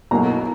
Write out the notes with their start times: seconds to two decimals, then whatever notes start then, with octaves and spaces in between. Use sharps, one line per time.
0.11 B1 B2 F#3 A#3 A#5